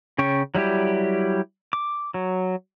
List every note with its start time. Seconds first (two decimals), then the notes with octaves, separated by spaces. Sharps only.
0.18 C#3 C#4 G5 C#6
0.55 F#3 G3 E4 G4
1.73 D6
2.14 F#3